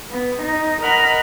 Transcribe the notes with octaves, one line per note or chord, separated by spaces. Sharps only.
B3
D#4
A#4 D#5 F#5 B5 F6